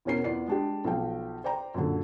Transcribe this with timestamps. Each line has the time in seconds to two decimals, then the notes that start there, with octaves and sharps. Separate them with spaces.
0.05 E2 B2 C#4 A#4 C7
0.24 E2 F4 D5 C7
0.47 G#3 D4 G4
0.84 B1 F3 G5
1.44 C5 D5 G5 A#5
1.74 F#2 A#2 D3